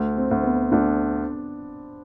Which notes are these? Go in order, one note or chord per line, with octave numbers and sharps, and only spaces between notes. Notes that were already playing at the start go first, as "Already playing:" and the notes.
Already playing: D2
C4
D2
B3
D2 D4